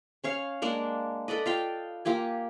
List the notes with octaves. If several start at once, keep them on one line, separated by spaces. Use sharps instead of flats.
C#4 C#5 F5
G#3 A#3 D4
A4 B4 D5 D#5
F4 F5 G5
A#3 F4 G4 G#5